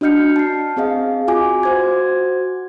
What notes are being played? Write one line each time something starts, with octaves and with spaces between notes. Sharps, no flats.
D4 F#4 D#5 F6 G6 C#7
A5 C7
C4 G#4 D#5 F5
F4 F#4 G#5 D6
F#4 C5 G#6